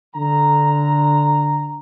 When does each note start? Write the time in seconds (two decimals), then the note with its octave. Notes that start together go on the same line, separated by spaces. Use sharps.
0.15 D3 A#5